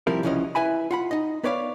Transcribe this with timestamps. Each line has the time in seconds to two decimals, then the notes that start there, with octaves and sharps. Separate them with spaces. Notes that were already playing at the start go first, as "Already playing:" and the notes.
0.07 C3 F3 G3 C4 E4 A#4
0.23 C2 C#3 E3 F3 C#4 D#5
0.55 E4 B4 E5 G#5 B5
0.91 F4 F#5 B5
1.11 D#4 D#5
1.44 B3 B4 C#5 D5 E5 F5